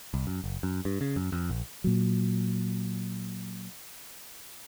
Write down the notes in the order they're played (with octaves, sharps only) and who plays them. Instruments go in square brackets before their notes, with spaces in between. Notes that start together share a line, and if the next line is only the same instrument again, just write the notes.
[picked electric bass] C2
F#2
F#1
F#2
G2
C#3
F#2
F2
A#1
[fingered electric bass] A#2 F#3